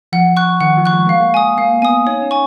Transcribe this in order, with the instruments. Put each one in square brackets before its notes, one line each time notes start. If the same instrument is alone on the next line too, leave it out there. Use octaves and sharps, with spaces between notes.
[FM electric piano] F3 [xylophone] F#5
[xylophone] C#6 F#6
[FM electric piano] D#3 [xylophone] F#5
[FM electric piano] F3
[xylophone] C#6 F#6
[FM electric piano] G#3
[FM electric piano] A#3 [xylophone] F5
[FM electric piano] G#3
[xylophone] G#5 D#6
[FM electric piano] A#3 [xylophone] F5
[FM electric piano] B3 [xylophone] G#5 D#6
[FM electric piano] D#4 [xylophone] C#5
[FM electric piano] C#4
[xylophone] G#5 C#6